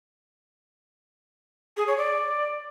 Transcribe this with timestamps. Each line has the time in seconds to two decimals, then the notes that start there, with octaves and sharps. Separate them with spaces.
1.77 G#4
1.87 C#5
1.97 D5